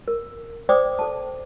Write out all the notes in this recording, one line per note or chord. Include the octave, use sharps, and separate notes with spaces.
A#4
C5 D5 G5 D6 D#6
A4 A5